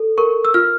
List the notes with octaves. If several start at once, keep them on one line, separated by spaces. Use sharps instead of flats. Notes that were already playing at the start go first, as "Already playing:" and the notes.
Already playing: A4
A#4 C#6
E6
F4 F6